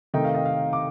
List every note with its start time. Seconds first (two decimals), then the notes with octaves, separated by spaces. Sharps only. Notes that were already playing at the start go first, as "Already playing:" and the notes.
0.14 C3 D#3 A3 D#4 G5
0.24 F5
0.35 D#5
0.45 F5
0.73 D6